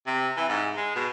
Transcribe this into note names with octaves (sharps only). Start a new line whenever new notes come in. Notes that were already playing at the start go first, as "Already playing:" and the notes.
C3
E3
G#2
G#3
B2